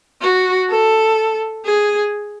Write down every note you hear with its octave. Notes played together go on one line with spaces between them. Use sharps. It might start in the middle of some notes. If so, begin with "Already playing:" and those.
F#4
A4
G#4